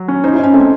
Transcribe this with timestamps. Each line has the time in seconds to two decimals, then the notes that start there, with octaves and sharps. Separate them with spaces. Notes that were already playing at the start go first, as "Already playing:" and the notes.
Already playing: F#3
0.08 C#4
0.24 D#4 C5
0.33 E4
0.39 C#4 D#4
0.53 A3 C4